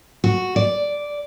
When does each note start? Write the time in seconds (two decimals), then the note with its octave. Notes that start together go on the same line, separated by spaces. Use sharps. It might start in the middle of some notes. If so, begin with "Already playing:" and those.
0.24 F#4
0.56 D5